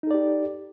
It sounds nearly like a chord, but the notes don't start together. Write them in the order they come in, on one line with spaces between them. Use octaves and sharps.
D#4 A4 D5 G4